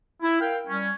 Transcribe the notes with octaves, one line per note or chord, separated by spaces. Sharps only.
E4
A#4 F5 G5
G3 C#4